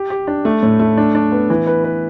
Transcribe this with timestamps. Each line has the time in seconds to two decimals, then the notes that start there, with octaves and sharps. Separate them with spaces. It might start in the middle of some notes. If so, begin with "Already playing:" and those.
Already playing: G4
0.10 G4
0.27 D4
0.45 A3
0.63 A2
0.80 A3
0.97 D4
1.15 D4
1.32 B3
1.50 E3
1.67 B4
1.84 B4